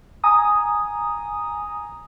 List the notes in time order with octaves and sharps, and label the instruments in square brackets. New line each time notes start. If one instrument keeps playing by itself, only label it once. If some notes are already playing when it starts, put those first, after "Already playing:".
[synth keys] G#5 A#5 D#6